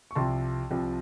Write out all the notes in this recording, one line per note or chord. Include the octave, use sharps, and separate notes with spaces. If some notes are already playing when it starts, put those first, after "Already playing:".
C#6
C2 C3 F3 A5 C6
C2 C3 F3